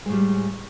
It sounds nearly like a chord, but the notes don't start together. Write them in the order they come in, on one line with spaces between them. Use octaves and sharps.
G#3 A2 G3